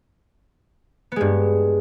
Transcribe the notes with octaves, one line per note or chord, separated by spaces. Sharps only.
G2 G#3 B3